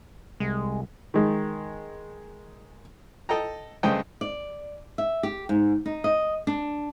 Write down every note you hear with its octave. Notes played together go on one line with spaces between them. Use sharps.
C2 G#3
D#3 G#3
A4 D#5 G5 A#5
G2 C#3 A3 C5 D#5 G5
D5
E5
G4
G#2
D#4
D#5
D4